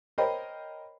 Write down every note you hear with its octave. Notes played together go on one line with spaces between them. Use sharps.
A#4 C5 C#5 D#5 G5 B5